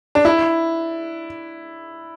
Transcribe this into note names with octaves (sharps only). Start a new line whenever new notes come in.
D4
E4